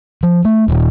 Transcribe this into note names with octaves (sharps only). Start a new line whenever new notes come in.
F3
A3
D#1